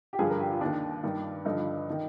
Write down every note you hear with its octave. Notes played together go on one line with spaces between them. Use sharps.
G4
G2 D3 F3 G#4
A#4
G4
F4
D#2 D#3 D4
G2 D#3
G2 D3 F3 D#4
D#3